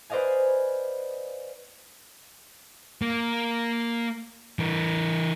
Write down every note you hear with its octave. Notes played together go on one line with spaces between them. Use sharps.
B4 C5 D5 D#5 F5 G#5
A#3
E3 A#4